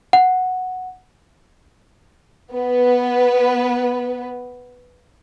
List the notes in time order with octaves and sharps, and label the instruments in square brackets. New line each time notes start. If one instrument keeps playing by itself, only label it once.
[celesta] F#5
[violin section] B3 B4